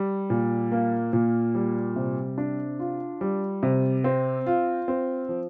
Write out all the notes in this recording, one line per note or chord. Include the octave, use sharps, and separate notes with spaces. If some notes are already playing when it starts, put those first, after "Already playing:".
Already playing: G3
A#2
A#3
A#2
G3
C3
D4
F4
G3
C3
C4
F4
C4
F3